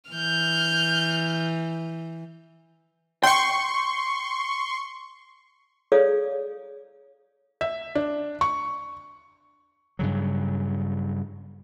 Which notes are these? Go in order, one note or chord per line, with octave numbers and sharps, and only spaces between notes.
E3 F6 G6
G5 C6 C#6
G#4 A4 C#5 D5 F5 D#6
E5
D4
C#6
G2 C#3 F#3